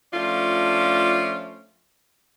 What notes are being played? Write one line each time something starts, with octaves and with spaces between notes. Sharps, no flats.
F3 A3 C#4 D4 F4